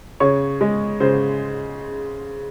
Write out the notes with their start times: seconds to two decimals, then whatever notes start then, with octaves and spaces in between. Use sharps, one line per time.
0.20 C#3 C#5
0.61 G#3
1.00 C#3 C5